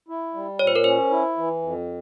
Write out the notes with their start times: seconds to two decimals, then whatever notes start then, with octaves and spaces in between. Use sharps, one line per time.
0.09 E4
0.34 G3
0.59 A#2 C#5
0.67 C5
0.76 A#4
0.84 C#4 C5
1.11 E4
1.37 E3
1.62 F2